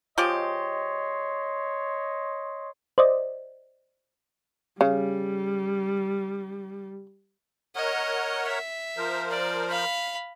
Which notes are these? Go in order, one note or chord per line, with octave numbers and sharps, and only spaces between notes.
F3 G#3 G4 C#5 D#5 C6
C5 D5 D#5
C#3 G3
A#4 C#5 D#5 F#5
E5
F3 A#4 C5
D5
F5 B5